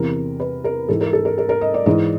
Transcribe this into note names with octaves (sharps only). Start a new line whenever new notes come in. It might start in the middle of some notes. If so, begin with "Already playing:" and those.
Already playing: E2 C3 E3 A#4
B4
A#4
G#2 E3 A4
A#4
A4
A#4
A#4
A#4
D#5
D5
G#2 E3 D#5